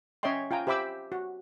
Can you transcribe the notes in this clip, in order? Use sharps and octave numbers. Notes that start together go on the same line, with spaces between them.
C#4 C#5 D#5 E5 G5 C6
F4 G5 G#5 A#5
G4 C5 E5 B5 D6 E6
F#4